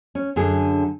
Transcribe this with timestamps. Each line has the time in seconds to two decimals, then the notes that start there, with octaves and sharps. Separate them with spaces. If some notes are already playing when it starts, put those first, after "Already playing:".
0.15 C#4
0.36 F#2 D3 G#4